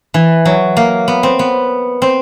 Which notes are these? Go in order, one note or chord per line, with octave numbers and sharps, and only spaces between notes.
E3
F#3
A#3
B3
C4
B3
C4